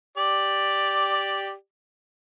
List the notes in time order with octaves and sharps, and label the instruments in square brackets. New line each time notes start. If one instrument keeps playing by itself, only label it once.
[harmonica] G4 D5